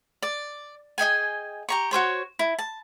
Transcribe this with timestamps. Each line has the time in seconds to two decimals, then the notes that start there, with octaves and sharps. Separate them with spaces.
0.22 D5
0.98 G#4 D#5 G5 G#5
1.69 G4 A#5 C#6
1.91 F#4 G#4 C5 C#5
2.39 E4
2.59 A5